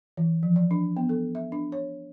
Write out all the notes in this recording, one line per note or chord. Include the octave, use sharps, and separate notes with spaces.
E3
F3
D5
D4
B3
A4
E5
D4
C#5